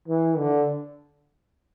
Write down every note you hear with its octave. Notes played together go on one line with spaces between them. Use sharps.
E3
D3